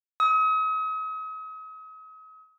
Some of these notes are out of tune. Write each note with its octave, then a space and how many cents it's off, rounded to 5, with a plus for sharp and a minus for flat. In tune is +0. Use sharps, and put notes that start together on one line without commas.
D#6 +40